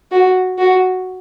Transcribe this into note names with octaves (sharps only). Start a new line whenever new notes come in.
F#4
F#4